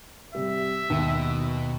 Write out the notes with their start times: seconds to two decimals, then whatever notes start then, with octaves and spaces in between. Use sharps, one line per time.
0.35 C3 G3 E5
0.90 D#2 B2